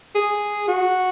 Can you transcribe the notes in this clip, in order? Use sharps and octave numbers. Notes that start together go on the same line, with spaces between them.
G#4
F#4